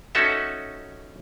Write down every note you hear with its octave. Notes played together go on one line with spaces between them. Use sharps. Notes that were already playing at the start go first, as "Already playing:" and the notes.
C#4 D#4 F#4 A4 E5